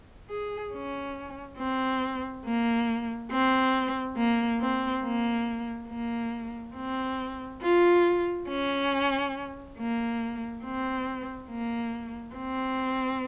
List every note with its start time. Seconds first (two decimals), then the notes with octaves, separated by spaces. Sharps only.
0.29 G#4
0.73 C#4
1.58 C4
2.45 A#3
3.32 C4
4.17 A#3
4.61 C4
5.04 A#3
5.89 A#3
6.75 C4
7.62 F4
8.48 C#4
9.79 A#3
10.64 C4
11.50 A#3
12.36 C4